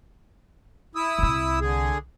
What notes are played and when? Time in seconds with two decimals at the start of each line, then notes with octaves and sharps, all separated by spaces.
0.95 E4 D#6 E6
1.18 C2 C3
1.61 D3 G#4